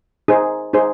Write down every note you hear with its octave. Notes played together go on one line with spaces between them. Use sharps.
D#4 G#4 C5
D#4 G#4 C5